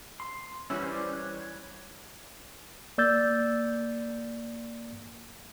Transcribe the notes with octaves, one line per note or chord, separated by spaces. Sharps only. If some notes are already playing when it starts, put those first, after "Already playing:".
C6
E3 G3 C#4 E4 F#4
C5 D5
C#5 F#6
A#3 D5 E6 G6 A6